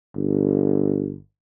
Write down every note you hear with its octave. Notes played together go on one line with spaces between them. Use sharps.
G1